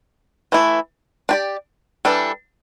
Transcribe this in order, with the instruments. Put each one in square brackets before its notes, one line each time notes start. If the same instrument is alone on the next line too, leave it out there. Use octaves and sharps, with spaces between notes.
[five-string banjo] E3 A3 E4
D4 G4 D5
E3 G3 D4 A4